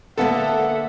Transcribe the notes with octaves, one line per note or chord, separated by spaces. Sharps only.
D3 A#3 B3 A4 E5 F#5 A5